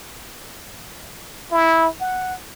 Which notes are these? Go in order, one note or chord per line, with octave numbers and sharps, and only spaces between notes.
E4
F#5